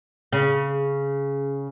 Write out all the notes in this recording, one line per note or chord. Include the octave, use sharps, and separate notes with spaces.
C#3